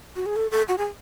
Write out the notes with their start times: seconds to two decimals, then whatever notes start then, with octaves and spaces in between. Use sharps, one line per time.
0.16 F#4
0.26 G#4
0.36 A4
0.51 A4
0.68 F#4
0.78 G#4